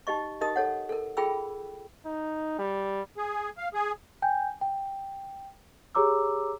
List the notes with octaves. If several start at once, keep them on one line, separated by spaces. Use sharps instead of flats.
D#4 G4 D#5 C#6
D#4 G4 A#4 D#5 D#6
A4 C#5 F#5
A4 A#4
F4 G#4 A4 G5 B5 E6
D#4
G3
G#4
F5
G#4
G5 G#5 G6
G5
G4 G#4 C#5 A#5 D6 E6